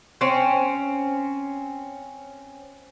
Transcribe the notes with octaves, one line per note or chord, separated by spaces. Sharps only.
C4 C#4